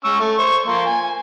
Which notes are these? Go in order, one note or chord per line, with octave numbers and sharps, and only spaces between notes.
C#4 C#6 E6
A3
C5 C#6
F3 A#3 C6
G#5